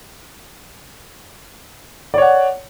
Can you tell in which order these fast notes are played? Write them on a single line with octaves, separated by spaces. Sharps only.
D5 C#5 F#5